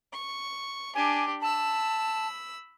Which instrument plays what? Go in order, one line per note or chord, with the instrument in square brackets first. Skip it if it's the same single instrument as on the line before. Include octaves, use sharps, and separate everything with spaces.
[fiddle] C#6
[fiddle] D4 G4 [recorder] G#5
[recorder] A5 [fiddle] B5 E6